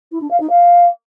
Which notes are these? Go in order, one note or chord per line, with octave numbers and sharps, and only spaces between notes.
E4
D4
F5
D#4
F5